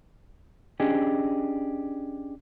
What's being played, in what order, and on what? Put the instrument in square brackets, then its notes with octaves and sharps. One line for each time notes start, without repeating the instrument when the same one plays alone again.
[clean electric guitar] C#4 D4 G4 G#4 D#5